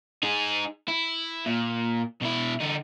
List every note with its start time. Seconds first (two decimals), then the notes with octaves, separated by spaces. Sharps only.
0.23 D#4 G#4
0.88 E4
1.46 A#2
2.22 B2 E4
2.61 D3 D#4